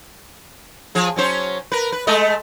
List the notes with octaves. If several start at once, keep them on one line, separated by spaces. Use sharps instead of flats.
F3 G#4
F#3 C#4 C5
A#4 B4
B4
G#3 A3 D#5